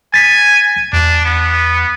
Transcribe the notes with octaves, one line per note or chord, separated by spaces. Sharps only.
G#5 A6 B6
E2 D4
B3